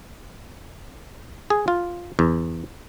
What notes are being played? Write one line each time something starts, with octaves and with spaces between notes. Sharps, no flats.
G#4
F4
E2